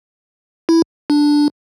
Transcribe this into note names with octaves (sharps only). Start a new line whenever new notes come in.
E4
D4